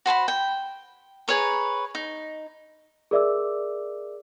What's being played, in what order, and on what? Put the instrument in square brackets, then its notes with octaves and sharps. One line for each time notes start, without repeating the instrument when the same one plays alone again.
[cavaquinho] F#4 C5 A5 B5
G5
G#4 B4 C#5 A#5
D#4
[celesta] G#4 A#4 D5 E5 D6 E6